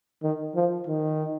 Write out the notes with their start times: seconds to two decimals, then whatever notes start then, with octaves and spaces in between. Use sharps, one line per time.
0.23 D#3
0.55 F3
0.87 D#3